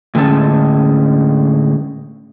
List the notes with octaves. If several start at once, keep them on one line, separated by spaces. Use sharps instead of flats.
A2 D3 G#3 C#4 A5